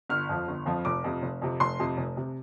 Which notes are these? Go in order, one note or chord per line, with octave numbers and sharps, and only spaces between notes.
G1 F6
F2 F3
G1
F2 F3
F1 D6
F2 C3
F1
F2 C3
F1 C6
F2 C3
F1
C3